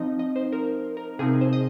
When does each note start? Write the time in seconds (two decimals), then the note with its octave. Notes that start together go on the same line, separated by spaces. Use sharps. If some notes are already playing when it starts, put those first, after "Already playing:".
Already playing: F3 C4 D#4 D#5
0.19 D#5
0.36 C5
0.52 A#4
0.97 A#4
1.19 C3 F3 C4 D#4 G#4
1.41 C5
1.53 D#5